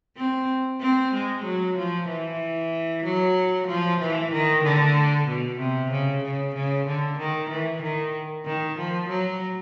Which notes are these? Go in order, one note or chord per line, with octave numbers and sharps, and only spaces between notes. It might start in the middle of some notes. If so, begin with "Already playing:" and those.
C4
C4
G#3
F#3
F3
E3
F#3
F3
E3
D#3
D3
B2
C3
C#3
C#3
C#3
D3
D#3
E3
D#3
D#3
F3
F#3